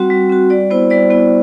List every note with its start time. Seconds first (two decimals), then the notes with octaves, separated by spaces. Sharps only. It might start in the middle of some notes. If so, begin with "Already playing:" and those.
Already playing: G3 C4 F#4 F#5
0.10 G3
0.30 C4 F#4
0.50 G3 D5
0.70 B3 E4 C5
0.90 G3 D5
1.10 B3 E4